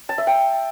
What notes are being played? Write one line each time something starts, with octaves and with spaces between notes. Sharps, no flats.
A5
E5
G5